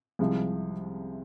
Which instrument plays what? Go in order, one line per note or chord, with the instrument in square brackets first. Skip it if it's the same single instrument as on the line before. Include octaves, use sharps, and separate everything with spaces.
[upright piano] C2 C3 F3 G#3